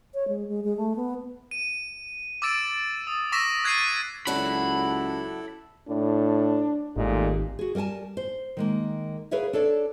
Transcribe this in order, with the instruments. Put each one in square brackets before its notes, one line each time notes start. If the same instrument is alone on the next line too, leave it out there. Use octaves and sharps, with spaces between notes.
[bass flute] C#5
G#3
G#3
G#3
A3
B3
[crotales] D#7
D6 E6 A6 D7 E7
D#6
C#6 D6 E6 A#6 B6 E7
F#6 G#6 A6 C7 D#7
[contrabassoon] C#2 [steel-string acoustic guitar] F#3 D4 F#4 [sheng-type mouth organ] E4 A4 [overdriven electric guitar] B5
[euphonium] A2 [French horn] D4
[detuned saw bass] G#1 [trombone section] A#2 G#3 D#4 [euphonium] A3 [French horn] G4
[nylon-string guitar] F#4 G#4
G3 A#4 F#5 G#5 A5
C5
D#3 G#3 A#3
G#4 A#4 B4 C#5 E5 F5
D4 A4 C#5 D5